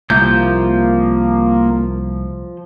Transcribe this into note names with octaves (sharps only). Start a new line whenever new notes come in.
C2 F3 A#3 G6